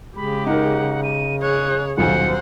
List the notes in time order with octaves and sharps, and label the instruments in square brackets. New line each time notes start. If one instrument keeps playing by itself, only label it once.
[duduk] C#3 [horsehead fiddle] G#3 G4 [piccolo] B5
[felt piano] D#4 A#4 [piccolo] F#5
[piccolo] D#7
[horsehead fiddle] G#4 C#5 [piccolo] F#6
[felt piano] D#1 B1 [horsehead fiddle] C5 F#5 [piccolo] C#7